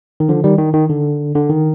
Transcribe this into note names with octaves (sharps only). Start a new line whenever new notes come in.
D#3
D3 F3
D#3 G3
D#3
D#3
D3
D3
D#3